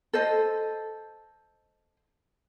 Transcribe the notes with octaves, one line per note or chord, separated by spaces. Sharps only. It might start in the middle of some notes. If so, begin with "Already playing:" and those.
A4 C5 D#5